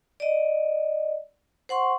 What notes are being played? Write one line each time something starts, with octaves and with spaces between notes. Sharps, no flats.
D5 D#5
C5 F#5 C6 C#6